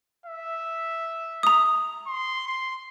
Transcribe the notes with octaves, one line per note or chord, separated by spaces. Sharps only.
E5
A#5 D#6
C6
C6